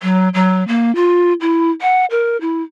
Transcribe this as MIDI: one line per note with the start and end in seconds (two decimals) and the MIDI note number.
0.02 0.29 54
0.34 0.66 54
0.68 0.93 58
0.95 1.33 65
1.41 1.71 64
1.81 2.05 78
2.10 2.39 70
2.41 2.63 64